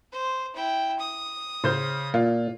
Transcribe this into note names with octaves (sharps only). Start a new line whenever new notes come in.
C5
E4 G5
D#6
C#3 C5 G6
A#2 F4